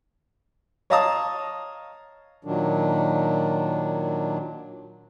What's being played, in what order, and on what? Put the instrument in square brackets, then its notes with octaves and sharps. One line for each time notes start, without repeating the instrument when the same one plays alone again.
[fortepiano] C#5 D#5 F5 A5 A#5 D#6
[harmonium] A#2 D#3 F#3 D4